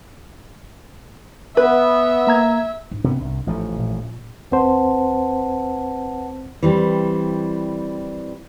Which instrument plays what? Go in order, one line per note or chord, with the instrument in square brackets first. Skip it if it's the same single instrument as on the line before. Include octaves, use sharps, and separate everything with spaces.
[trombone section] B3 [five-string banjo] B4 [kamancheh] E5
[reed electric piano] A#3 A#5 G#6
[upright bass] G#2 D4
[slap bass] C3 B3
C2
A1 F3 A3
[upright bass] A#2
[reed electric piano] D#2 C4 C5 [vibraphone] B4 F#5 A5
[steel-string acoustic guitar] E3 G3 C4